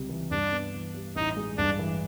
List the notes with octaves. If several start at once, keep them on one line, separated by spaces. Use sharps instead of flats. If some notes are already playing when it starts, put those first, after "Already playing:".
Already playing: C#2 C3 G3
E3
G2 D4
B3
E3
G3
A1 D#4
G#3
G2 D4
E3